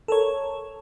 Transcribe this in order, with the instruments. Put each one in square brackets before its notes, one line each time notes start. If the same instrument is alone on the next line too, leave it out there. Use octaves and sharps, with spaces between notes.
[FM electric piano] A4 A#4 C#5